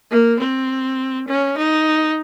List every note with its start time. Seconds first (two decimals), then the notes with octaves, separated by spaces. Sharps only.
0.11 A#3
0.39 C4
1.28 C#4
1.57 D#4